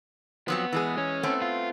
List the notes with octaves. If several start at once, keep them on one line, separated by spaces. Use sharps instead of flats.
F3 F#3 B3 C4
E3 G#3 G#4
C#4
A3 B3 C4
F4